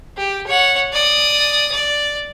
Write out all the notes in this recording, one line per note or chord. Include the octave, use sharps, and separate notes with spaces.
G4
C#5 F#5
D5 D#6
D5